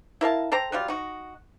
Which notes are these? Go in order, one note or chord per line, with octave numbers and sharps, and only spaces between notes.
E4 A#4 F5 A5
A4 C5 G5 A#5
F#3 G3 F4
D#4 F#4